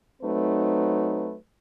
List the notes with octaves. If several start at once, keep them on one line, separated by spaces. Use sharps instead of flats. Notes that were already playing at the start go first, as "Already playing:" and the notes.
F#3 A3 C4 D#4 B4